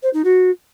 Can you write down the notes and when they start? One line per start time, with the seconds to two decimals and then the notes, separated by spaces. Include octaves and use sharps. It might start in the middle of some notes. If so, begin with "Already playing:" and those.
0.02 C5
0.13 D#4
0.24 F#4